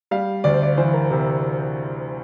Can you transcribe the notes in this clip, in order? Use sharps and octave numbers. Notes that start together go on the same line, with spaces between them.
G3 F5
D2 D5
C5
D5
E3 C5
A#4
C3